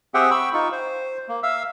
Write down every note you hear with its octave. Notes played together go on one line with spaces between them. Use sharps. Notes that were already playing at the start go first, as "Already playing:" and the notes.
C4 G4 G#4 E5 F#5 G5
G5 B5 C#6 E6
D#4 F4 C#6
C5
A#3
E5 F5 E6